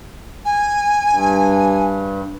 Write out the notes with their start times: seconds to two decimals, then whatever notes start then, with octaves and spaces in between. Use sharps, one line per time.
0.45 G#5
1.09 G2